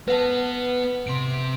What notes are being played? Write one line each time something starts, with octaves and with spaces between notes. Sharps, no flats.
B3 B4 F#5 A5
C3 C6 D7